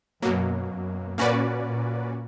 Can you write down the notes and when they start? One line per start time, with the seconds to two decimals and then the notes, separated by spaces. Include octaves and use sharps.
0.22 F#2 B2 F#3 A#3
0.70 F#2
1.18 A#2 A#3 C#4 F#4 B4 D5
1.66 A#2